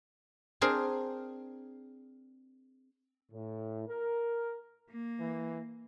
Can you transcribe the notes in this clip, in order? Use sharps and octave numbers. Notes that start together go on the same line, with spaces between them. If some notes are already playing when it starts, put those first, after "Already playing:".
C4 D4 G#4 A#4 C6
A2
A#4
A#3
E3